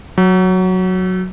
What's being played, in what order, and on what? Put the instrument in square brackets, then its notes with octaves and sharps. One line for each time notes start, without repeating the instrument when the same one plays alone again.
[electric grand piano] F#3